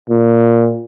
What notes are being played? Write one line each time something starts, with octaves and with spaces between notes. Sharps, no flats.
A#2